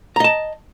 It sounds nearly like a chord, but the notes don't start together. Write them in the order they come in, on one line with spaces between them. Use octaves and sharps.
A#5 D#5 A5